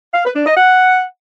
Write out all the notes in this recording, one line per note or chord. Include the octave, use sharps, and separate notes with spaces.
F5
B4
D4
D#5
F#5